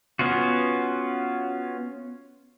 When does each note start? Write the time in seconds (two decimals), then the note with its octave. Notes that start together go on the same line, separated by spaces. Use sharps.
0.19 B3 C#4 F4 F#4